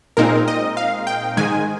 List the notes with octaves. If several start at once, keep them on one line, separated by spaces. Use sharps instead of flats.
A#2 G#3 C4 D#4 A#4
D#5
F5
G5
G#2 D#3 G#3 G#5